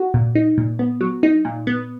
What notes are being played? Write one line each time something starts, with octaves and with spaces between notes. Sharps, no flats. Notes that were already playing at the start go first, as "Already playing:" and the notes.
Already playing: F#4
A#2
D#4
A#2
B3
F#3
D#4
A#2
B3